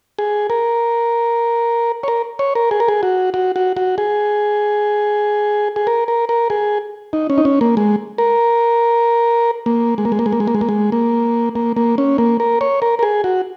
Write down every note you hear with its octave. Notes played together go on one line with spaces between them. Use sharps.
G#4
A#4
C#5
A#4
C#5
A#4
G#4
A#4
G#4
F#4
F#4
F#4
F#4
G#4
G#4
A#4
A#4
A#4
G#4
D#4
C#4
D#4
C#4
A#3
G#3
A#4
A#3
G#3
A#3
G#3
A#3
G#3
A#3
G#3
A#3
G#3
A#3
G#3
A#3
A#3
A#3
C#4
A#3
A#4
C#5
A#4
A#4
G#4
F#4